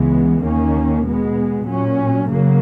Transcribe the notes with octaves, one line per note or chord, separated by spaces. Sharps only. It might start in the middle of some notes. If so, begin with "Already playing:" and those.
Already playing: C#2 C#3 E3 G#3 B3
D#2 D#3 A#3 C#4
B2 G#3 B3
A#2 F#3 C#4
F#2 C#3 F#3 A#3